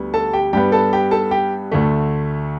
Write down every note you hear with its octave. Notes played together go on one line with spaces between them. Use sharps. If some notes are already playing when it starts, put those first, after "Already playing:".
Already playing: D2 D3 G3 B3
A4 A5
G4 G5
G2 G3 B3 G4 G5
A4 A5
G4 G5
A4 A5
G4 G5
D2 D3 A3